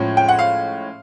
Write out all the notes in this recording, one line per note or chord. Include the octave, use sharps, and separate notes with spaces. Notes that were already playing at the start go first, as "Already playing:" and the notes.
Already playing: A2 F3 G#3 C#4
G5
F#5
F5